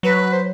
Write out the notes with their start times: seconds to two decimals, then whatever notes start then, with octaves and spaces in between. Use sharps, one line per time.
0.03 F#3 B4
0.33 C5